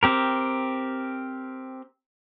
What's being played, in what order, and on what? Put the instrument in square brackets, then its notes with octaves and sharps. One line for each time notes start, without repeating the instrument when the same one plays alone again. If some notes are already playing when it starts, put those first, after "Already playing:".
[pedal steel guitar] C4 G4 A#4